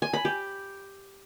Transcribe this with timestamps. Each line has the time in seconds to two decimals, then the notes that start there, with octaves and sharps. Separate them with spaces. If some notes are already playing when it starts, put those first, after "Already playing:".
0.02 G#5
0.13 B5
0.25 G4